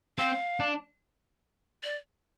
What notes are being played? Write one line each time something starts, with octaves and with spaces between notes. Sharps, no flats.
C4 F5
D4
D5